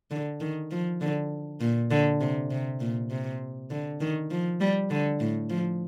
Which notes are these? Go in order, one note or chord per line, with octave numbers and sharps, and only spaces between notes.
D3
D#3
F3
D3
A#2
D3
C3
C3
A#2
C3
D3
D#3
F3
G3
D3
A2
F3